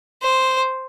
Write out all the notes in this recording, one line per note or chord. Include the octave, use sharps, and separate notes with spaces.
C5